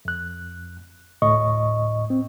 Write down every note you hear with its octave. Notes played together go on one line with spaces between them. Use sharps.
F2 F#6
D2 A2 D#5 C#6
C4